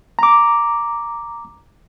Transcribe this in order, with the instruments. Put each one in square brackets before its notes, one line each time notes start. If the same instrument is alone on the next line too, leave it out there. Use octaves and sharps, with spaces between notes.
[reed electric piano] A#5 D6